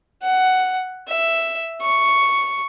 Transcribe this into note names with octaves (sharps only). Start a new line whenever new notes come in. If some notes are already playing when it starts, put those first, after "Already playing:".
F#5
E5
C#6